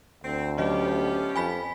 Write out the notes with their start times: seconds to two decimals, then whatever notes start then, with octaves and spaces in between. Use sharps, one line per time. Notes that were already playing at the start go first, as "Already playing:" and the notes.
0.24 D2 C4
0.58 F3 F#3 B3 C#4 G4 D#5
1.36 F2 G#5 B5 B6